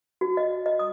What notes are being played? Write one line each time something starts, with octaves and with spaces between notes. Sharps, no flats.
F#4
D#5
D#5
D#6